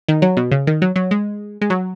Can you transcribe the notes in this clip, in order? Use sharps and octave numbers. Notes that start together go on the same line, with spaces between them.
D#3
F#3
B2
C#3
D#3
F#3
F#3
G#3
G#3
F#3